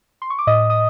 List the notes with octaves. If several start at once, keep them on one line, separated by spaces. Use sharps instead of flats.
C6
C#6
D6
A2 D#5 D#6
D#6